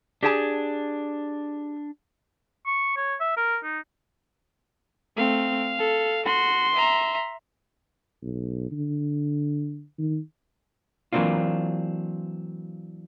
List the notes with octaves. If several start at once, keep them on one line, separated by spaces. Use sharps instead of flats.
D4 G4 G#4 A5
C#6
C#5
E5
A#4
D#4
A3 C4 F5
A4
F#4 C6
E5 A#5
B1
D3
D#3
E3 F#3 A#3 C4 D4 F4